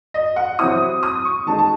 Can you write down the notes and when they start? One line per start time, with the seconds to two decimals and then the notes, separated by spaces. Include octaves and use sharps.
0.14 D#5
0.36 F#5
0.59 C3 F#3 C4 E4 D#6
1.03 D#6
1.25 C#6
1.46 D#3 G#3 D#4 A5
1.59 A5